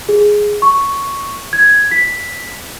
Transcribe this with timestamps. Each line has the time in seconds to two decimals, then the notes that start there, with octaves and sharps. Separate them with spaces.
0.09 G#4
0.62 C#6
1.53 G#6
1.91 B6